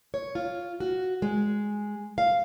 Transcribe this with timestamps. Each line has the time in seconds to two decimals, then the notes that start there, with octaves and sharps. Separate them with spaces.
0.14 C#5
0.35 F4
0.80 F#4
1.22 G#3
2.18 F5